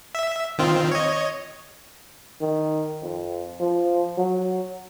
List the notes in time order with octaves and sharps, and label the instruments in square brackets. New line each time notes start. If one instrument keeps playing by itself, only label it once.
[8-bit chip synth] E5
D#3 C4 F4
C#5 D#5
[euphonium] D#3
F2
F3
F#3